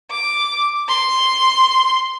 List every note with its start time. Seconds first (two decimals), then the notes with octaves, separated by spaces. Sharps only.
0.11 D6
0.88 C6